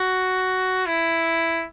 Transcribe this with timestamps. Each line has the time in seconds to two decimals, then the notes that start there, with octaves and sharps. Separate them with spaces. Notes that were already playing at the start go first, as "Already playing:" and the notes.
Already playing: F#4
0.86 E4